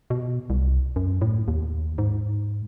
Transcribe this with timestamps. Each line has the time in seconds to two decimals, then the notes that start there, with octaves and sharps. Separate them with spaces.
0.10 B2
0.50 C2
0.96 F#2
1.21 A2
1.48 D#2
1.98 G#2